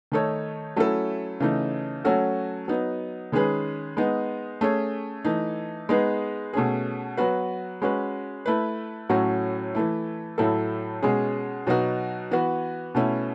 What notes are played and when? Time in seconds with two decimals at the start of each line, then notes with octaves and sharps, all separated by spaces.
0.12 D#3 A3 D#4 A4 C#5
0.76 F#3 A3 C#4 E4 A4
1.40 C#3 E3 A3 D#4
2.05 F#3 A3 C#4 F#4 A4
2.68 F#3 B3 D#4
3.32 D#3 G#3 C#4 G#4 B4
3.97 G#3 B3 D#4
4.61 A3 C#4 G#4 C#5
5.25 E3 A3 D#4
5.89 G#3 B3 D#4 G#4 B4
6.53 B2 A3 C#4 G#4
7.17 F#3 B3 F#4 B4
7.82 G#3 C#4 F#4 B4
8.46 A3 E4 B4
9.09 A2 F#3 A3 C#4 F#4
9.75 E3 A3 E4
10.38 A2 F#3 A3 E4 A4
11.02 B2 G#3 C#4 G#4
11.67 B2 F#3 B3 D#4 F#4
12.31 E3 B3 F#4 B4
12.95 B2 A3 C#4 E4